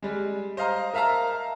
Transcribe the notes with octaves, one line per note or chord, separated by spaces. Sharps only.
G3 G#3
C5 D#5 F5 A#5
A#4 E5 F5 A5 A#5